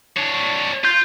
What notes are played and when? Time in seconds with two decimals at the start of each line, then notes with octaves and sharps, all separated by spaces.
0.17 D4 C#5
0.84 F4 G6